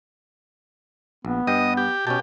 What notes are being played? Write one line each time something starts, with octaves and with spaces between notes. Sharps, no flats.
A#1 B3
G2 D#5 G5
G4
B2 C#4 G4 A5